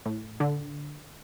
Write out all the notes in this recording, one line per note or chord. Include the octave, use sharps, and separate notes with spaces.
A2
D3